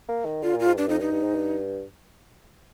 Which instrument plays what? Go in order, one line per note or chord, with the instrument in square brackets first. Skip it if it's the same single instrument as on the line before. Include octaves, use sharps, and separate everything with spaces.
[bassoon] A#3
D#3
[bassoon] D3 [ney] F4
[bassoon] A#2
[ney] F4
[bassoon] G#2
[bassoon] G2 [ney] D4
[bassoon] F2 [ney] D#4
[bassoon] G2 [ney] D#4
[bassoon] G2
G#2
G2